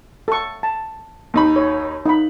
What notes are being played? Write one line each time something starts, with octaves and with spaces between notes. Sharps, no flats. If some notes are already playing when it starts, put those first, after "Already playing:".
A4 C#6
A5
D#2 D#4 B5
C#5
D#4 B5